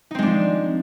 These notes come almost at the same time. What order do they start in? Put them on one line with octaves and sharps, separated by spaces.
D#4 C4 G#3 D4 F3